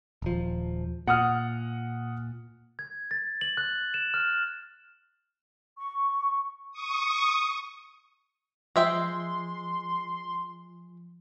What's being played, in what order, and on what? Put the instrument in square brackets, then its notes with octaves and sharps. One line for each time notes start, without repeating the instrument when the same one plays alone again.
[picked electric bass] D#1 F3
[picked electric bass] A#2 [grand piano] F#5 D#6 F6
[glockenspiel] G#6
A6
F#7
F#6
E7
F6
[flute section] C#6
[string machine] C#6 D#6
[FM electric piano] F3 [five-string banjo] G#3 E5 G5 [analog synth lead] C6